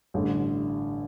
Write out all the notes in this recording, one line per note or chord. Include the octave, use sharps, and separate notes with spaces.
A1 G2 D3